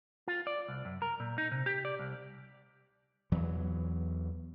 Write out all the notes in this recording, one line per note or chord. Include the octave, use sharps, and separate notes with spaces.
F4
D5
C2
F#2
A#4
A#2
D#4
C3
G4
D5
C2
E2 E3 F#3